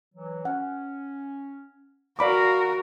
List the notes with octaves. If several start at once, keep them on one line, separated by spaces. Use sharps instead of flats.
E3 F#3
C#4 F#5
F#4 A#4 D5 F5 B5 D6